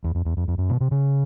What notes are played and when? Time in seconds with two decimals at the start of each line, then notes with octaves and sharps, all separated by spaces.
0.04 E2
0.15 F2
0.25 E2
0.37 F2
0.48 F2
0.58 F#2
0.69 B2
0.81 C3
0.91 C#3